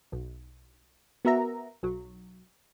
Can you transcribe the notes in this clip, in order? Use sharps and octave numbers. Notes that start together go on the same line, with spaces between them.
B1
B3 F#4 A#4 E5 A#5
B1 F#3